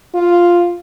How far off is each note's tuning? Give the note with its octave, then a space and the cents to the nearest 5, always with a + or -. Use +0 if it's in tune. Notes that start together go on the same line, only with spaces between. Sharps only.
F4 +0